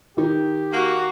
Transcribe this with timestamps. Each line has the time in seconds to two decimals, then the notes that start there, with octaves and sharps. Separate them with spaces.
0.17 D#3 D#4 G4
0.73 A#3 F#4